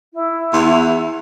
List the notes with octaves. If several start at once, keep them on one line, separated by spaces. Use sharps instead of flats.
E4
E2